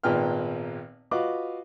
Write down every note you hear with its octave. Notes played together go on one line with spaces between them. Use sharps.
G#1 A#2 B3 B4 G5 F6
F4 F#4 B4 D#5 F5 D6